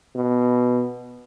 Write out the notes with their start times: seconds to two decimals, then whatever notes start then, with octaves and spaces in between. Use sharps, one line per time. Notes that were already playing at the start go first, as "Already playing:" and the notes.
0.15 B2